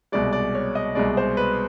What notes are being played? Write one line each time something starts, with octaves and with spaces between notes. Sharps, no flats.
C2 B2 G#3 D5
D5
C#5
D#5
C2 B2 G#3 D5
C5
B4